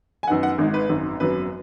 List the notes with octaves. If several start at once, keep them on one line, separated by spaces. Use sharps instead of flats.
G#5
F#2 D#3 B3 D#4 F#5
F#5
G#1 G#2 D#3 G#3
B4
G#1 F#2 D#3
G#1 F#2 F#3 B3 B4